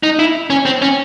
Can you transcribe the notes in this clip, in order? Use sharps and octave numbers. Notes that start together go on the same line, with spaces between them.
D#4
E4
C#4
C4
C#4